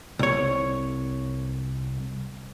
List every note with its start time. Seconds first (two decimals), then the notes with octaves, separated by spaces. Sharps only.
0.19 C2 C#5